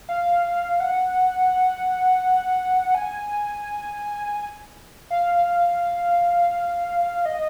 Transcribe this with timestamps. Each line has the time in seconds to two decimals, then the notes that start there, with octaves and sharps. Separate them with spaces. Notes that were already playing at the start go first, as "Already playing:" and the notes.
0.09 F5
0.80 F#5
2.95 G#5
5.10 F5
7.25 D#5